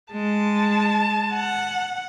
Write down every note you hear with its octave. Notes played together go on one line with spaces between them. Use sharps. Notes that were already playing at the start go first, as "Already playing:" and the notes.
G#3 A5
F#5